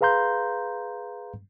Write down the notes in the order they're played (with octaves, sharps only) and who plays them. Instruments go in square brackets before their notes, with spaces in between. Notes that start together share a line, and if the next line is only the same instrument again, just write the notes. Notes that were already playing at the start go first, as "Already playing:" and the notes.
[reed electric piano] G#4 B4 F5 A#5 C6 G6